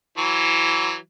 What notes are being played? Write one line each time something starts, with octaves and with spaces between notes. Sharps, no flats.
E3 F#3